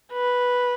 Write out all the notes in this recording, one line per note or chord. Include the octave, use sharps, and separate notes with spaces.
B4